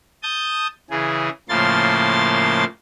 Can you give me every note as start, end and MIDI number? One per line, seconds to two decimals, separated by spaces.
0.23 0.67 81
0.23 0.67 87
0.23 0.67 91
0.90 1.29 49
0.90 1.29 52
0.90 1.29 68
1.49 2.64 45
1.49 2.64 49
1.49 2.64 53
1.49 2.64 58
1.49 2.64 84
1.49 2.64 93